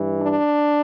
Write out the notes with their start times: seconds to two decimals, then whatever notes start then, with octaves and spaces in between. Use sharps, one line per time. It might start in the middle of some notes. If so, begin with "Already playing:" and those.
Already playing: G2 E3
0.21 D4